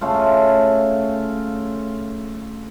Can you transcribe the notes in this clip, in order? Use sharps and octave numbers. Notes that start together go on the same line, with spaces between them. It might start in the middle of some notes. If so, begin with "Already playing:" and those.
C#3 A3 F4